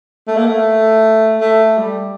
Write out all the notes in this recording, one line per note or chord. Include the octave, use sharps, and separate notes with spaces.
A3
A#3
A3
A3
G3